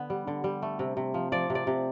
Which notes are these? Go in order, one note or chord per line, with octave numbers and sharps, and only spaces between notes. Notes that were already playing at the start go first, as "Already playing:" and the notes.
Already playing: D3 B3
G3
D3
G3
A3
C3
C3
F3
F3 D5
C3
D5
C3